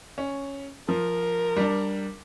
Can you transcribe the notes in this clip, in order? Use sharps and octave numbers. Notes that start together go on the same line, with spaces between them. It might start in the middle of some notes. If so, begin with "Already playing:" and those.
C#4
F3 A#4
G3 D4